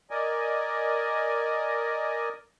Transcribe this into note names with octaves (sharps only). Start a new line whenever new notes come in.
A#4 D5 D#5 G#5